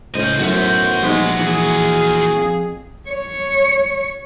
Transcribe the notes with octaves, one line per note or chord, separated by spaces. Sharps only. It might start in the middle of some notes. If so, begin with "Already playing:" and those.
C#2 A2 C#4 C5 D#5
B1 F#2 A2 F#4 E5
A#1 G3 G#3 B3 D#4
E3 G#4
F2
C#5